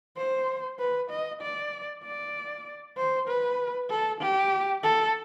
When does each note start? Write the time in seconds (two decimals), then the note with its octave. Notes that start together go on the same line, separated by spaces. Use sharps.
0.17 C5
0.79 B4
1.10 D#5
1.42 D5
2.04 D5
2.97 C5
3.27 B4
3.90 A4
4.21 G4
4.83 A4